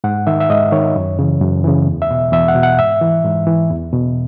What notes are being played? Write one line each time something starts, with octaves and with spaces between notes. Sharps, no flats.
G#2 F#5
D#3 E5
E5
G#2 D#5
D#3 C#5
F#2
C#3 E3
F#2
C#3 E3
E2
E5
B2
E2 E5
F#5
B2
F#5
G#2 E5
E3
G#2
E3
E2
B2